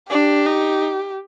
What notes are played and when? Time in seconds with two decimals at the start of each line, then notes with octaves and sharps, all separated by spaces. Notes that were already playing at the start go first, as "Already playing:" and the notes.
0.10 D4 G4
0.46 D#4